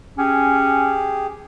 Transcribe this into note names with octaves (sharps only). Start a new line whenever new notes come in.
C#4 G4 G#4